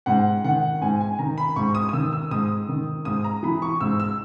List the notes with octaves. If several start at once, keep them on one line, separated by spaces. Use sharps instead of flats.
G#2 F#5
D#3 F#5
G#2 G#5
G#5
D#3 A#5
B5
G#2 C#6
D#6
D#6
D#3 E6
E6
G#2 D#6
D#3
G#2 D#6
A#5
E3 B5
C#6
G#2 E6
E6